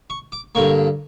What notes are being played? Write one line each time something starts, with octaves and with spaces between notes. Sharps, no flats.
C#6
D6
G2 D3 A#3 C#6